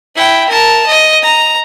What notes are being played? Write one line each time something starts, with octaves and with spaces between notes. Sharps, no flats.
E4 G5
A#4 A5
D#5
A#5